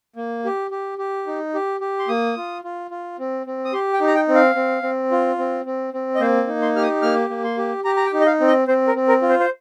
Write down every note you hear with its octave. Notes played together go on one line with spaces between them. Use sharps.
A#3
G4
G4
G4
D#4
G4
G4
C6
A#3 D#6
F4
F4
F4
C4
C4
D#6
G4 C6
G5
D#4
A#5
G5
C4
F5
C4
C4
F4
C4
C4
C4
D#5
A#3 C5
D#4
C6
G4 F6
D#6
A#3 F6
A#3
C6
G4
G4 A#5
A#5
G5
D#4
D#5
F5
C4
D#5
C4 C5
A#4
C4
A#4
F4
C5
C5